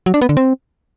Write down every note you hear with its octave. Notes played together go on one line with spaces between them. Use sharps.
F#3
D4
B3
D3
C4